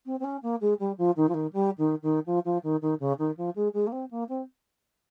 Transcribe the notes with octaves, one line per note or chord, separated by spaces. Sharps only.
C4
C4
C#4
A#3
G#3
G3
F3
D#3
F3
D#3
G3
D#3
D#3
F3
F3
D#3
D#3
C#3
D#3
F3
G#3
G#3
A#3
C4
A#3
C4